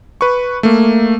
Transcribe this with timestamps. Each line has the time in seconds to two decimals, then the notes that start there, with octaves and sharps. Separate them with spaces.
0.21 B4 C#6
0.63 A3 A#3